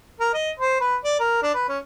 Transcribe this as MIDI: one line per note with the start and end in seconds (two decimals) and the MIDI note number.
0.20 0.30 70
0.34 0.51 75
0.60 0.80 72
0.81 0.96 71
1.04 1.18 74
1.20 1.38 70
1.43 1.54 62
1.55 1.64 71
1.68 1.78 61